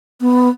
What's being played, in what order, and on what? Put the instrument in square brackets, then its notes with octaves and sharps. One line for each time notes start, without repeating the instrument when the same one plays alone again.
[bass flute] B3